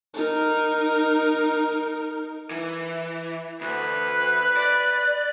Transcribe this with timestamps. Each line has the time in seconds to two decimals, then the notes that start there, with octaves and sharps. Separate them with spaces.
0.14 D#4 A#4
2.51 E3
3.61 D2 B4
4.57 D5